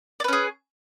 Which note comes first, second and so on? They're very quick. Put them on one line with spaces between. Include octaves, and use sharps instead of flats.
D5 B4 C#4 G#4